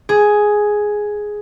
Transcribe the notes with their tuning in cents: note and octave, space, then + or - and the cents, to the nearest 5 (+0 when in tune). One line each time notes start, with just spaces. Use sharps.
G#4 +5